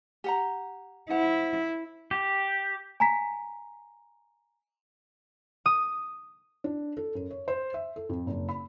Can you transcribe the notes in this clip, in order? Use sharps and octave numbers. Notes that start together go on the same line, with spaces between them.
G4 F#5 A#5
E4 C5 F#5
G4
G#5 A#5 B6
D#6
D4
A4
F#2
C#5
C5
E5
A4
F2
F#1
B5